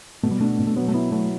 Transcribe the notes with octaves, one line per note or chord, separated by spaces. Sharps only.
B2 A3
G3
A3 D4
B2
A3
F#3 B3
A3
B3 E4
F#3 A3